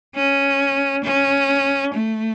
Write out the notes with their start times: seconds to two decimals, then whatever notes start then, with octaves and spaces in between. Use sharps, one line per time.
0.15 C#4
1.04 C#4
1.93 A3